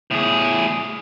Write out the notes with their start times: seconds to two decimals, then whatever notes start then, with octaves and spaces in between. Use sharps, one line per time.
0.11 A2 G#4